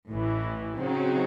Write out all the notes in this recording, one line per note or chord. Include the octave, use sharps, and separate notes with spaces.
A1 A2 E3
C#3 F#3 C4 D#4